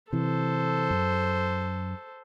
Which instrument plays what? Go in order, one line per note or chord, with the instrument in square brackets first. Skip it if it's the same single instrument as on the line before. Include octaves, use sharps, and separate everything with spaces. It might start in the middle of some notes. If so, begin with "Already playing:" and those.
[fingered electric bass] C3 E3 [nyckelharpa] A4 C5
[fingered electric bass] F#2